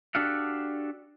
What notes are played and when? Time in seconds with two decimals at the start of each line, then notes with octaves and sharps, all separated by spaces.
0.15 D4 F#4 G4 A4 F5 F#5